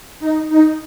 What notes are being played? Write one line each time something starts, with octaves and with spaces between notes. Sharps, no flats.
D#4
D#4